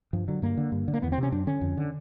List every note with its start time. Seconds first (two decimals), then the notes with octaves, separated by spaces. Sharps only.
0.13 G2 F3
0.28 D3 F#3
0.42 G2 A#3
0.57 D3
0.72 G2
0.88 D3
0.94 A#3
1.02 E2 B3
1.12 C4
1.18 C3 C#4
1.32 F#2 D4
1.47 D3 C#4
1.61 F2
1.77 D3